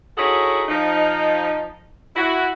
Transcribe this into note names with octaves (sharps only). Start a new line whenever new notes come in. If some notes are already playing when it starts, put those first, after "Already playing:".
D#4 E4 F#4 G#4 A4 C#5
F3 D#4
E4 F#4